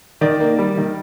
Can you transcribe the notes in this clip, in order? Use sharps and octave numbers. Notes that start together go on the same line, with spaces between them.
D#3 D5
A#3
G3
D#3